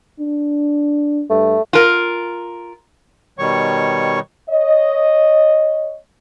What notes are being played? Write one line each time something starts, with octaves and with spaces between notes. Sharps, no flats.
D4
G2 A3
F4 A#4
B2 D#3 G3 C#5 C#6
C#5 D#5